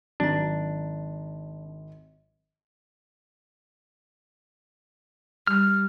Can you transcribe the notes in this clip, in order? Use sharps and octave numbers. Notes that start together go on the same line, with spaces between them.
G#1 F#3 D4 A#5
G3 F6